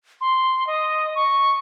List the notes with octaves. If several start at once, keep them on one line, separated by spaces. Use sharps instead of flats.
C6
D#5
C#6